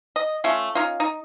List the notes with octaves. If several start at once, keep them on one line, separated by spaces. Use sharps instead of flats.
D#5
A3 C#4 F4
C#4 D#4 F4
D#4